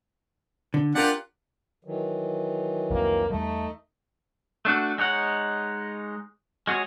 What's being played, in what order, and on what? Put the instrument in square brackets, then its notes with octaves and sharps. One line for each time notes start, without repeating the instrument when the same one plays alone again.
[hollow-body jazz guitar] D3
[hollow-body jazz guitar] D4 A#4 [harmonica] F4 G4 F#5
[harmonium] D#3 E3 F#3
[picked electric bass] C2 F2 [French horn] A#3
[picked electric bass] E2 G3 [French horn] A3 [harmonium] D#4 D#5
[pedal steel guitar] A3 D4 F#4
G#3 D#4 C#5 F#5
G#3 F#4 G#4 C#5